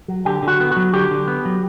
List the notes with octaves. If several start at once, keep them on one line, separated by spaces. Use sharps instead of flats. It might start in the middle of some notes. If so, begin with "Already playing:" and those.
F#3
D3 G4
D3 F#4
B3
F#4
F#3
D3 G4
D3
B3
F#3